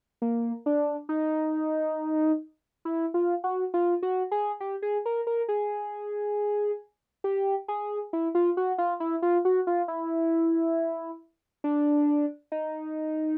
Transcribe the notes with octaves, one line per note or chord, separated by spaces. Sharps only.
A#3
D4
D#4
E4
F4
F#4
F4
F#4
G#4
G4
G#4
A#4
A#4
G#4
G4
G#4
E4
F4
F#4
F4
E4
F4
F#4
F4
E4
D4
D#4